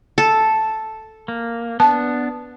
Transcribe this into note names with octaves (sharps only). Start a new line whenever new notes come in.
A4
A#3
B3 D4 A5